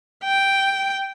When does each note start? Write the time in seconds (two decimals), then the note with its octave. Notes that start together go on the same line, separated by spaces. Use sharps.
0.24 G5